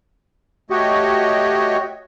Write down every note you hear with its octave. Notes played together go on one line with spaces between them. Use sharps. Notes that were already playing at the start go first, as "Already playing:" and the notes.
A3 F#4 G4 C#5 D#5